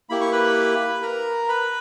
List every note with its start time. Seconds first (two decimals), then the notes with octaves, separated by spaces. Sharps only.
0.09 A#3 E4 G4 B5
0.21 C#6
0.32 B4 B5
1.02 A#4 A#5
1.48 B4 B5